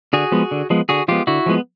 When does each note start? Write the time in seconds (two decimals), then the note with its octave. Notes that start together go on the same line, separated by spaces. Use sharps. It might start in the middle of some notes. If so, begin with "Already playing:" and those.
0.13 D3 F#4 G#4
0.32 F3 G#3 B3
0.51 D3
0.70 F3 G#3 B3
0.89 D3 F#4 G#4
1.08 F3 G#3 B3 F4 G4
1.27 D3 E4 F#4
1.46 F3 G#3 B3